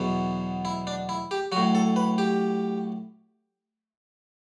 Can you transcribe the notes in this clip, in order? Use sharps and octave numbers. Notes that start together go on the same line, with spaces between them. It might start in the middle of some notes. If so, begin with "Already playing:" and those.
Already playing: E2 B2 F#3
E4
D4
E4
G4
A2 F#3 F#4
A4
B4
G4